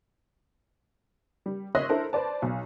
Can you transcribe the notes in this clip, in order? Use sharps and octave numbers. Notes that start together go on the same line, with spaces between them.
G3
C#5 D#5 E5 C6 F#6 A#6
D4 E4 A4 A#4 C5
B4 C5 D5 A5
B1